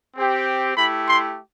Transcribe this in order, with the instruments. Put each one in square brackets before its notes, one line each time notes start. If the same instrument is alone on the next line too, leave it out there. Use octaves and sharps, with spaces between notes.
[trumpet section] C4 G4
A3 E4 G4 B5
C6